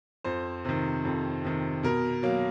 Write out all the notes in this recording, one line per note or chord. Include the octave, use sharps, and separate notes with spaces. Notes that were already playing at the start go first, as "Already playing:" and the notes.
F2 C5
C3 D#3
F2
C3 D#3
B2 A#4
F#3 A#3